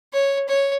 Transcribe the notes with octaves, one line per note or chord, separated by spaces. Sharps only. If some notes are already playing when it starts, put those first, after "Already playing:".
C#5
C#5